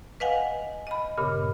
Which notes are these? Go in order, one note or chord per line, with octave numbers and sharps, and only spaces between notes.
B4 D#5 F5 F#5 G#5
D#5 B5
G2 A#2 C#3 B3